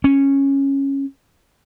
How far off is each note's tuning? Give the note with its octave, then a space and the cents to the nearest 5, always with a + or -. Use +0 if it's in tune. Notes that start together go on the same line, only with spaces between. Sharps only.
C#4 -10